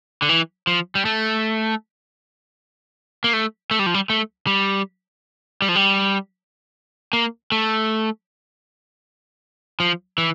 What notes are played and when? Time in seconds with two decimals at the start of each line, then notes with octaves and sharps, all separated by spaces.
0.22 D3
0.29 E3
0.67 F3
0.95 G3
1.05 A3
3.24 A#3
3.33 A3
3.71 A3
3.79 G3
3.86 F3
3.94 G3
4.10 A3
4.47 G3
5.62 G3
5.69 F3
5.76 G3
7.13 A#3
7.52 A3
9.80 F3
10.18 E3